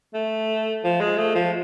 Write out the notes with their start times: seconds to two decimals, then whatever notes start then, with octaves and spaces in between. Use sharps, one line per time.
0.14 A3
0.84 F3
1.00 G#3
1.18 A3
1.35 F3